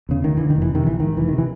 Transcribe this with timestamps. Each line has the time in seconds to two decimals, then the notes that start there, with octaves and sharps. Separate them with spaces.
0.09 E2 C#3
0.24 D2 D#3
0.37 D3 E3
0.50 D#3
0.56 F1
0.62 E3
0.71 F2 C3 D#3
0.87 A#1 E3
1.00 G#2 D#3
1.17 F1 E3
1.28 C3 D#3
1.38 E3